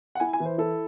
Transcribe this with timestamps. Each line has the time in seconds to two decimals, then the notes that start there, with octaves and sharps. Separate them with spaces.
0.15 F#5
0.20 E4 G#5
0.33 G#5
0.40 E3
0.45 C5
0.58 E4 A4